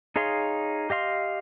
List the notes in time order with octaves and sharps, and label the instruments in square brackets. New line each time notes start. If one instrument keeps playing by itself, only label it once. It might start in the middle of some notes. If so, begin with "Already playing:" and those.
[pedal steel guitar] D#4 G#4 C#5 F5 C6
G4 D#5 F5 C6